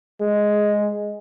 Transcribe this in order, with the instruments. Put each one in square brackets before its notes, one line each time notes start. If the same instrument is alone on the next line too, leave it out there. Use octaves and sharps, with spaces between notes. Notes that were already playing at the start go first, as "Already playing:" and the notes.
[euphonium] G#3